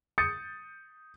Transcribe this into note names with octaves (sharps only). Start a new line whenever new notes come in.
D#6 G6 A6 C#7